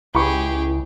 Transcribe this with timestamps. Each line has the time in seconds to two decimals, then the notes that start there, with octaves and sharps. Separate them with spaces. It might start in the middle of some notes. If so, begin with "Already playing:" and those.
0.15 C#2 E4 G4 G#4 B5 C#6